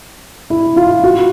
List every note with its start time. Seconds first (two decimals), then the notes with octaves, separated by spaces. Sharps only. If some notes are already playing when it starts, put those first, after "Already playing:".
0.50 E4
0.76 F4
1.04 F#4